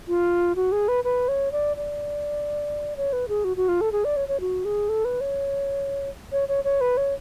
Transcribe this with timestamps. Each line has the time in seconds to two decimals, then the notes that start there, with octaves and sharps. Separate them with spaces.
0.08 F4
0.56 F#4
0.72 G#4
0.88 B4
1.04 B4
1.28 C#5
1.52 D5
1.77 D5
2.97 C#5
3.13 B4
3.28 G#4
3.44 F#4
3.57 F#4
3.69 F4
3.81 A4
3.92 G#4
4.05 D5
4.16 C#5
4.28 C#5
4.40 F#4
4.65 G#4
4.89 A4
5.05 B4
5.21 C#5
6.32 C#5
6.49 C#5
6.64 C#5
6.81 B4
6.97 C#5